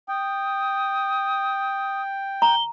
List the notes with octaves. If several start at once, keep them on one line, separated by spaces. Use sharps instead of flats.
G5 D#6
A#5 G7